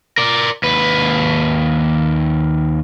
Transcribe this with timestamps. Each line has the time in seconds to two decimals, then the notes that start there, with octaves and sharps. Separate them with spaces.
0.18 A#4 D5
0.64 D#2 B4